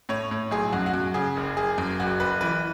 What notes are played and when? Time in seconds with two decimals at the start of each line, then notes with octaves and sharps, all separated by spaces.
0.09 A2 C#5
0.31 A2
0.51 B1 G#4
0.72 F#2 F#4
0.86 F#4
0.94 F#2
1.14 C#3 G#4
1.37 F#1
1.57 F#1 G#4
1.78 F#2
2.00 F#1 F#4
2.20 F#1 B4
2.41 E3 B4